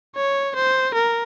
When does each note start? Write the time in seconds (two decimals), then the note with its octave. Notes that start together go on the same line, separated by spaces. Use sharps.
0.16 C#5
0.56 C5
0.94 A#4